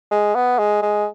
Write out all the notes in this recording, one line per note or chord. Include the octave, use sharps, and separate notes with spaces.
G#3
B3
G#3
G#3